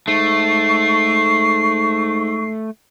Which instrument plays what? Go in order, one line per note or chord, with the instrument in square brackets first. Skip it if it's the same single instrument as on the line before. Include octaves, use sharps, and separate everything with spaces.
[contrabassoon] G#2 [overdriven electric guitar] A3 [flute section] C#6 [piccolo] C7